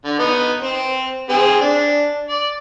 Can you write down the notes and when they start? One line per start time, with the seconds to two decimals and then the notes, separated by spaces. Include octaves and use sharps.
0.05 D3
0.19 B3 D#4
0.62 C4
1.29 C4 G#4
1.61 D4
2.29 D5